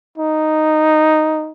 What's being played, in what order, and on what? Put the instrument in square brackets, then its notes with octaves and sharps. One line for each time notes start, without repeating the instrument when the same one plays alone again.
[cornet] D#4